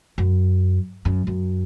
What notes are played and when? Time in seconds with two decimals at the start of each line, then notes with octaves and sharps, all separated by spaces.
0.18 F#2
1.05 F#2
1.27 F#2